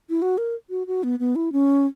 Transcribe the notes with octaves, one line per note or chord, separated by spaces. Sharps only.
E4
F#4
A#4
F#4
F#4
B3
B3
E4
C#4